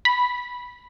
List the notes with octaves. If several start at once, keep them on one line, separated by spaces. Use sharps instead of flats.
B5